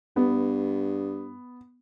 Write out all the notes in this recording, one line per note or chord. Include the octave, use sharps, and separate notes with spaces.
G2 B3